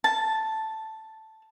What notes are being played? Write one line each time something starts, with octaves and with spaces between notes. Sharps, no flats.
A5